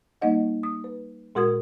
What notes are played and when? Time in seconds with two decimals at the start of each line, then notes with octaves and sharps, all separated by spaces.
0.22 G3 A#3 D#4 D#5 F#5
0.63 D#6
0.84 B4
1.35 A#2 G#3 F#4 A#4 D#6 G#6